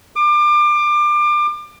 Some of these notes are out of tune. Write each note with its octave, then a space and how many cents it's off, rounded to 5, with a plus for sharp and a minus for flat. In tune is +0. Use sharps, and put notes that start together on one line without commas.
D6 +30